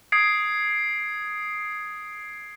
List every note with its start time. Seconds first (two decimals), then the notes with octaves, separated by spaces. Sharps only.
0.12 D#6 G#6 C7 D7